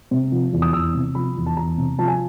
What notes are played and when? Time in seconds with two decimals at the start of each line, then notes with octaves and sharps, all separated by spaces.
0.11 C3
0.32 F3
0.53 E2
0.62 D#6
0.73 E2 E6
0.94 C3
1.15 F3 B5
1.37 E2
1.46 A5
1.57 E2 A#5
1.78 C3
1.99 F3 A5
2.08 G#5